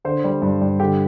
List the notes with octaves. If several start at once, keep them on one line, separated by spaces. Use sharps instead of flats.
D3 C5
G3
G2
G2
D3 G4